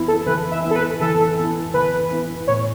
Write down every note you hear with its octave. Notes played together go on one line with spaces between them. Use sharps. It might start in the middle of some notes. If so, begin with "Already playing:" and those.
Already playing: E3 B3 E4
A4
E3 B4
E5
B3 E4
A4
B4
E3 A4
B3 E4
E3 B4
B3 E4
A2 C#5